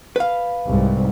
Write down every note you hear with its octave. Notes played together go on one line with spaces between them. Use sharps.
B4 F5
C2 G#2